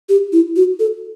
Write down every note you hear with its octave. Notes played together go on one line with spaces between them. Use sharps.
G4
E4
F#4
A4